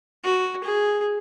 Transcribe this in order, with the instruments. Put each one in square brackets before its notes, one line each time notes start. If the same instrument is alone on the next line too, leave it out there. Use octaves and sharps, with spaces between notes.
[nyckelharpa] F#4
G#4